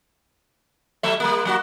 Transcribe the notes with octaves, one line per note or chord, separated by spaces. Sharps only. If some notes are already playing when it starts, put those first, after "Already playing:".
F#3 A3 E5
G3 A#3
F#3 A#3 F#4